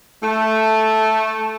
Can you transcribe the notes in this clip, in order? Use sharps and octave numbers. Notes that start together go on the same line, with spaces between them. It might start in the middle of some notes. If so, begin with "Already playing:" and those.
A3